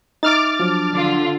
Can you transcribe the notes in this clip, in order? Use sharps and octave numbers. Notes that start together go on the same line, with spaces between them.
D#4 E5 D6 F6 A6
F3 F#3 D4
D3 F4